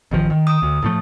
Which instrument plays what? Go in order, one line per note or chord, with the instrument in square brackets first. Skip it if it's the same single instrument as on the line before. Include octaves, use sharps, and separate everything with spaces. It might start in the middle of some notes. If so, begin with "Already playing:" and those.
[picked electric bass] A1 D#3 F3
D#3
[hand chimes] D#6
[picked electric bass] D2
A2 F3 A3